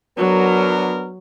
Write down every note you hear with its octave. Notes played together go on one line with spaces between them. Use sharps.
F#3 B3 D4 A#4